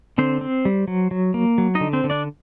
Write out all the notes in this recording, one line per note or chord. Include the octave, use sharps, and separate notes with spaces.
D3 C4 C5
C4
G3
F#3
F#3
A#3
F#3
D#4 D#5
D3
C4 C5
D3
D4 D5